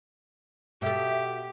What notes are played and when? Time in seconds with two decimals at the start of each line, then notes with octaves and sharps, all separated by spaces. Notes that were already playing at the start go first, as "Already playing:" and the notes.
0.82 B2 G4 A4 E5